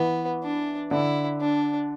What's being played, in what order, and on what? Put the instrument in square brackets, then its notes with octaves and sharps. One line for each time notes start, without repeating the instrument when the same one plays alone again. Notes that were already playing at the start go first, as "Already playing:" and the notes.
Already playing: [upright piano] E3 [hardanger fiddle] B3
[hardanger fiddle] D4
[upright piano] D3 [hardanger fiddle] E4
[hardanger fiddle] D4